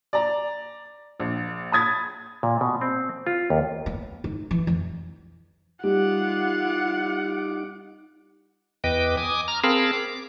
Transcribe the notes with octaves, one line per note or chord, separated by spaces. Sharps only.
D5 A#5
A#1
B5 D#6 G#6 A6
A#2
B2
C4
F4
D#2
B3
D#4
E3
F2
G3 D#4 F4 F#5 D6
E2 B4 D#5 G5 D6
G#5 D6 D#6
A#5 F6
C4 G#4 A#4 F5 A5 B5
D6